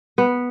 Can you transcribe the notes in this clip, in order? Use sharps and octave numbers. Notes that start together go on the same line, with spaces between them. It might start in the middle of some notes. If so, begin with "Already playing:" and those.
B3